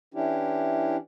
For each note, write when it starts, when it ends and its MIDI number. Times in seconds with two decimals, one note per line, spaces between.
0.14 0.97 52
0.14 0.97 61
0.14 0.97 62
0.14 0.97 64
0.14 0.97 67